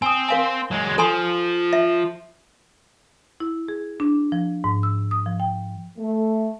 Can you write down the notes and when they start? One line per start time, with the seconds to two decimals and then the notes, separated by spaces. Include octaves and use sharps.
0.02 C4 G#5 D#6
0.29 A#4 F5 G#5
0.71 F#3 G#3
0.98 F3 A4 G#5 C6
1.73 E5
3.40 E4
3.68 G#4
4.00 D4
4.32 F3
4.64 G#2
4.83 E6
5.11 D#6
5.26 F3
5.40 G5
5.99 A3